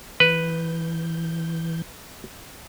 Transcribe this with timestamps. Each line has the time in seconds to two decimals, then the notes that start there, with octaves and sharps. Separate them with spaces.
0.20 E3 B4 G6